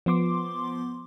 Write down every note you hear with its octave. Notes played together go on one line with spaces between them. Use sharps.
F3 B3 C6 D6